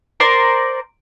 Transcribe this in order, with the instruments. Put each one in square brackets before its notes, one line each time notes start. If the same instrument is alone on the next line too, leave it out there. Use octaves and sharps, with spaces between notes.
[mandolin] A#4 C5 D5 C6